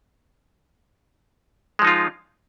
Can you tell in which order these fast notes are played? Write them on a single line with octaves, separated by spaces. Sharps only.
G#3 F3 D#4 F4